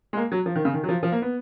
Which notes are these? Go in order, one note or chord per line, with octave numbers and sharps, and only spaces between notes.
G#3
A#3
F#3
F3
D#3
C#3
D#3
F#3
F3
F3
A#3
B3